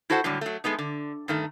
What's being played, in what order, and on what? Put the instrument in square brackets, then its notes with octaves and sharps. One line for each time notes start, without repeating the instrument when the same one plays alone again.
[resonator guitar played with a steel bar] E4 F#4 A4 C5 F#5
A2 D3 F#3 G3
F#3 A3
G#3 A3 B3 D#4
D3
G2 D#3 A3